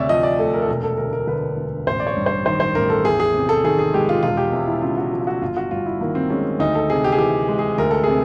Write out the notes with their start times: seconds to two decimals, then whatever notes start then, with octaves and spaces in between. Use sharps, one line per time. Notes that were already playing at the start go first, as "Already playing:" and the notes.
Already playing: D2 C3 C#5 D5 E5
0.09 F3 D#5
0.23 D5
0.39 A3 A4
0.54 A#4
0.62 A4
0.68 E1 A#4
0.83 A4
0.98 D2 A#4
1.13 A#4
1.27 D3 B4
1.57 E1
1.87 A1 C5
2.00 D5
2.07 C#5
2.16 G2
2.26 C5
2.46 D#3 C5
2.60 C5
2.75 A1 A#4
2.90 A4
3.05 E2 G#4
3.20 G#4
3.34 C3
3.49 A4
3.64 D#3 G#4
3.79 G#4
3.93 G#3 G4
4.09 F4
4.23 E1 F4
4.37 G4
4.52 E2
4.68 E4
4.82 C#3 F4
4.97 F#4
5.12 F3
5.20 F4
5.27 F#4
5.42 G1 F4
5.57 F#4
5.71 G2 F4
5.86 E4
6.01 D#3 A#3
6.15 C4
6.30 G#3 C#4
6.59 D2 D#4
6.75 A4
6.90 C3 G#4
7.04 G4
7.12 G#4
7.18 E3 G4
7.48 G#3
7.59 G#4
7.78 D2 A#4
7.91 A4
8.04 C3 G#4